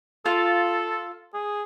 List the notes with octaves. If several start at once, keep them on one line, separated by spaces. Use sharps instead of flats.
F4 A4
G#4